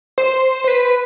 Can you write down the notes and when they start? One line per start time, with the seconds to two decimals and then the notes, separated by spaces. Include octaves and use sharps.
0.18 C5
0.64 C5
0.68 B4